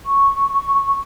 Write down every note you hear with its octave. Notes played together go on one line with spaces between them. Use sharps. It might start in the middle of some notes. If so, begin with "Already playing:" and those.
C#6